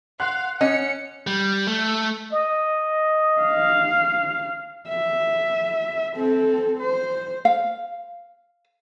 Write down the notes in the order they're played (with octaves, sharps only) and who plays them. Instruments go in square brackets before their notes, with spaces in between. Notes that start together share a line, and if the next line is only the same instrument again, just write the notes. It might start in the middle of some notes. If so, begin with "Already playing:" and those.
[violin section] F5 [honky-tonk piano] F#5 C6 F#6
[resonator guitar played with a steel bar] C#4 [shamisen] D#5 [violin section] C#7
[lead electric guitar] G3
A3
[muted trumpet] D#5
[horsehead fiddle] F5
E5
C4 A4
C5
[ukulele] F5